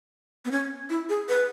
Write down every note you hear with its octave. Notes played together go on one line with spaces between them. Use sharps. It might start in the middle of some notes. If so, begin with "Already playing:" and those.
B3
C#4
E4
G#4
B4